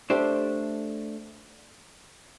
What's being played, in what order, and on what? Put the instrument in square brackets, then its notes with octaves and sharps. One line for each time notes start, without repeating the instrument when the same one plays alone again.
[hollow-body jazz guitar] A3 D4 G4 C5